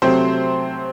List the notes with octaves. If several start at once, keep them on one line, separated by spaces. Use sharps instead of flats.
C3 F#3 A3 C4 C5